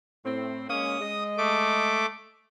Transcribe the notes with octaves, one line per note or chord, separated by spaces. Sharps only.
A2 C4
G#3 A#3 C#4 D#6
G#3 D#5
A3 D6